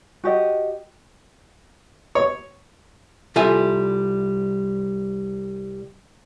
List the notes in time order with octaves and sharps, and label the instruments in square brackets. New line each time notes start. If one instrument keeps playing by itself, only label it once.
[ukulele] F#4 G4 D#5
[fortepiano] C#5
[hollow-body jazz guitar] C2 G3 F4 A4 E5 G#5